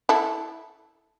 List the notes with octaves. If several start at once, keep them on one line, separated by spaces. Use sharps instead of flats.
E4 A4